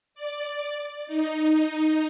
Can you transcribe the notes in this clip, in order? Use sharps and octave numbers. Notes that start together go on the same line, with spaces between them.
D5
D#4